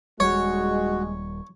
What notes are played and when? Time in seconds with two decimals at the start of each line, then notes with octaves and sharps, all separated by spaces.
0.20 D#1 G3 G#3 F#4 C#5